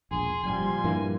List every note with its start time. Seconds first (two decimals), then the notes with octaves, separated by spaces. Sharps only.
0.11 E1 A#1 G#4 C6
0.43 F#1 A#2 F3 G3 G#5
0.84 G2 E3 A#3